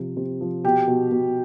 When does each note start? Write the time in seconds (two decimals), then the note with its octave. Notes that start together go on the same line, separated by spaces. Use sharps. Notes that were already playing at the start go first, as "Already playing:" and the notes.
Already playing: C3 F3
0.17 C3
0.41 F3
0.64 B2 G4
0.88 B2
1.12 B2